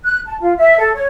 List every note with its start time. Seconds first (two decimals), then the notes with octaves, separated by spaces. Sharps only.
0.03 F#6
0.26 A5
0.40 F4
0.58 E5
0.77 A4
0.94 C#5